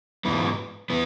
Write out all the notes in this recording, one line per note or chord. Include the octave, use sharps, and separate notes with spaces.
G#2 E3 B3
E3 B3